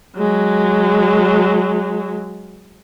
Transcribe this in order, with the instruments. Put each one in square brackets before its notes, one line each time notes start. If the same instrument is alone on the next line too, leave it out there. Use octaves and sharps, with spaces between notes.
[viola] F#3 G#3